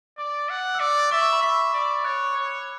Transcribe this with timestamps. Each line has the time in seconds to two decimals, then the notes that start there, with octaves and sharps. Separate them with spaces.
0.18 D5 D6
0.50 F#5
0.75 E6
0.80 D5 D6
1.11 E5 C#6
1.22 C#6
1.33 B5
1.43 E5 C#6
1.74 D5
2.04 C#5 F#6
2.36 C#5